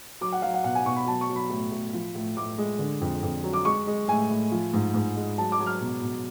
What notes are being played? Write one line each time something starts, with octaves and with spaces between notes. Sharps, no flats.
F#3 D6
F#5
F#3 F5
F#5
B2 F#5
G#5
B2 C#6
B5
F#3 A5
C#6
F#3
B5
A2
A2
F3
A2
A2 D6
G#3
D3
F2
F2
F#3
D6
G#3 C#6
G#3
A2 G#5
A2
F3
G#2
G#2
G#3
F#3 A5
D6
F#3
F6
B2
B2